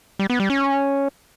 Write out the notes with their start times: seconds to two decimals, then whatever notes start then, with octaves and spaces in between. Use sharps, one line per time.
0.19 G3
0.30 B3
0.40 G3
0.50 C#4